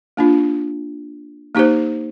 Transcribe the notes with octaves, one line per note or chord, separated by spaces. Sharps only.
A#3 D4 F4
A#3 D#4 G4 C5